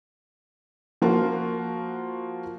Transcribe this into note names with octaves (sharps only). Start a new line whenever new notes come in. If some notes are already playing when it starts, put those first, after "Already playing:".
F3 A#3 F4 F#4